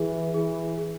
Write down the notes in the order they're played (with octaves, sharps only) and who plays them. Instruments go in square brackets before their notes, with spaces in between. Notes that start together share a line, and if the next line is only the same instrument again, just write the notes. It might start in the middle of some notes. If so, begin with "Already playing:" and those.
Already playing: [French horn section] E3 [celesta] G#4
[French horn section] E3 [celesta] G#4
[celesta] G#4